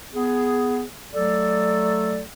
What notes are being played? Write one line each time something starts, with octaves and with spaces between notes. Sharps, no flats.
B3 G#4
F#3 A3 A4 D5